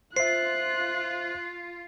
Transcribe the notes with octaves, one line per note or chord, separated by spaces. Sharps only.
F4 C5 E5 F#6 C7